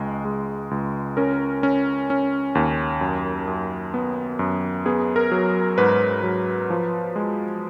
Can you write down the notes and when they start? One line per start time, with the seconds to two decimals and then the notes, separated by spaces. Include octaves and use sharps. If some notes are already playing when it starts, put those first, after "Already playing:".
Already playing: C#2 G#3
0.25 G#3
0.71 C#2
1.17 C#4 A#4
1.63 C#4
2.10 C#4
2.55 D#2
3.01 F#2
3.48 F#2
3.94 B3
4.39 F#2
4.86 B3 G#4
5.16 A#4
5.31 F#3
5.78 G#2 B4
6.23 F#3
6.70 F3
7.16 G#3